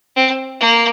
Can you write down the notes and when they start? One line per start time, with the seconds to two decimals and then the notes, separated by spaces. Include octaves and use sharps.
0.16 C4
0.61 A#3